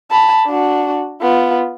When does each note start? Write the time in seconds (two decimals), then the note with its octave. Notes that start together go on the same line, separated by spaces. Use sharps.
0.11 A5 B5
0.47 D4 F#4
1.22 B3 F4